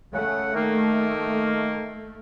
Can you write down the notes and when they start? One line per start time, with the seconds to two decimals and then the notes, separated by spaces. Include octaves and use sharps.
0.14 C#3 A3 F#5
0.54 D#3 A#3